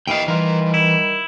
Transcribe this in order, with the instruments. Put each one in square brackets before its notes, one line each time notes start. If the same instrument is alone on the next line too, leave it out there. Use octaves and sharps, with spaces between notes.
[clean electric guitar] D#2 E3 F5 [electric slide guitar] D#5 G5
[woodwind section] D#3 G3 [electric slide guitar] E3 [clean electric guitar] F4 A#4
[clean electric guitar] E4